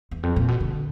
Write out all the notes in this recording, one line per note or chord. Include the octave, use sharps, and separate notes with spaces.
E2
F2
A#2
B2
D3